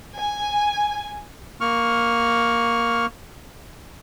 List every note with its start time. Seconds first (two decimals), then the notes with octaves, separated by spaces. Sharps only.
0.17 G#5
1.61 A#3 C#6 F6